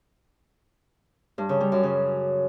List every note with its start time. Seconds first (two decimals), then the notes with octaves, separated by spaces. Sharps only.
1.38 G2
1.49 C#3
1.61 G3
1.72 F#2
1.83 C#3